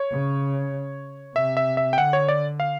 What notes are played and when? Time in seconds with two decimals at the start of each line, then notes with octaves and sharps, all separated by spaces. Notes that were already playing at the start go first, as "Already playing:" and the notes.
Already playing: C#5
0.12 C#3
1.36 C3 E5
1.57 E5
1.77 E5
1.93 G5
1.97 D3 F#5
2.13 C#5
2.29 D5
2.60 F5